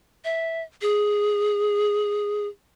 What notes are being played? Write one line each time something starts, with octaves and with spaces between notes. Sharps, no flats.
E5
G#4